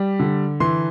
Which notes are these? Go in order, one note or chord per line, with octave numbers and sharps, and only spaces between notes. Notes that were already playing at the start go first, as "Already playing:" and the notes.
Already playing: G3
D3
E3 C6